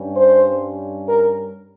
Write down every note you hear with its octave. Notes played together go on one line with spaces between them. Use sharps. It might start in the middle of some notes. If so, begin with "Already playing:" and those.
Already playing: G2 G3 C#4
C5
A#4